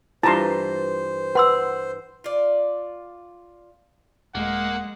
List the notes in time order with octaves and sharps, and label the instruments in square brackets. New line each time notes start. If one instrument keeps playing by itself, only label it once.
[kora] G2 E3 [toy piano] F4 [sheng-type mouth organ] C5 [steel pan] A5 A#5 C6
[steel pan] B4 [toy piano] F#5 C6 E6
[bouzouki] F4 D5
[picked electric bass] D#1 [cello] G#3 [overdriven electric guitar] A#3 [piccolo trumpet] F#5